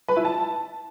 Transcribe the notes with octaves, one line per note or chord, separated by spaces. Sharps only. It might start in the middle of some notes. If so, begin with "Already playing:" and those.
B4
E4
A5